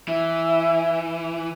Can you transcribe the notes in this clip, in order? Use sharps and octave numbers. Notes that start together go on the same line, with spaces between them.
E3 E5